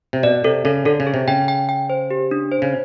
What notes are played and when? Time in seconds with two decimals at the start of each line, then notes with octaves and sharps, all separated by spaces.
0.13 C3
0.23 B2 D5
0.44 C3 A4
0.65 C#3 A4
0.85 D3 A4
1.00 C#3
1.07 G#4
1.14 C3
1.28 C#3 G5
1.48 G5
1.69 G5
1.90 C5
2.11 G4
2.31 D4
2.52 C5
2.62 C#3